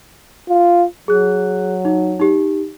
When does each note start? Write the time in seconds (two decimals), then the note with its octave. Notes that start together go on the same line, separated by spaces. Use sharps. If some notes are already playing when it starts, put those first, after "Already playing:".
0.49 F4
1.08 F#3 G#4 F#6
1.85 D#4
2.20 D#4 G4